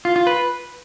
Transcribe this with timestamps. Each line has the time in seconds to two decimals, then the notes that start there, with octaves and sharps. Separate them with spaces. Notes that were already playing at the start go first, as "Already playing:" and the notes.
0.05 F4
0.16 F4
0.27 B4